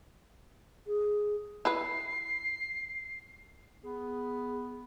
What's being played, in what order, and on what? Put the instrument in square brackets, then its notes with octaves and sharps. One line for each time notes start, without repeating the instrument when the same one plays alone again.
[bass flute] G#4
[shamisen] E4 B4 [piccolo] C7
[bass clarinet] B3 [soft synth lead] G#4